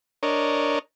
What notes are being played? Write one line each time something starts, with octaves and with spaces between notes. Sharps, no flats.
D4 A#4 C#5 D#5